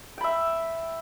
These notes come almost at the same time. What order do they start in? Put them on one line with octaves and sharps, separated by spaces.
G5 B5 E5